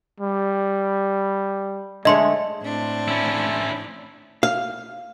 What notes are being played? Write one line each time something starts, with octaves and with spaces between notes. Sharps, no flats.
G3
D3 G#3 A3 C#5 D#5 C6
A2 C4 D4
C#4 E4
F5